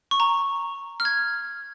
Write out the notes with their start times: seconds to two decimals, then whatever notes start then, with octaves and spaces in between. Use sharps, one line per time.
0.11 C#6
0.20 A#5
1.00 F6
1.05 G#6